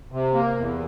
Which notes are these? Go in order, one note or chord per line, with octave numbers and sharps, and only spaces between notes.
C3
A#3
E2